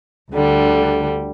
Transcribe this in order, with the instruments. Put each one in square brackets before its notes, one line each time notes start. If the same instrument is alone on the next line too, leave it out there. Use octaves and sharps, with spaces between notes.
[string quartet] D2 D3 G3